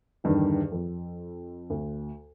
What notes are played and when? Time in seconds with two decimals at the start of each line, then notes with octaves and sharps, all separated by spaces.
0.24 E2 G2 D3 D#3
0.72 F2
1.70 D2